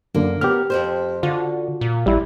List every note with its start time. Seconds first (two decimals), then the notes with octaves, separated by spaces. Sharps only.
0.14 F#2 D3 A#3
0.41 B3 C#4 G4 A#4 F6
0.70 F2 G#2 C5
1.23 D3 F4 F#4
1.81 A#2
2.06 A1 G3 E4